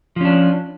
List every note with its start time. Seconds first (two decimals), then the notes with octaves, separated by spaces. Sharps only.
0.16 F3
0.21 C#4
0.25 D4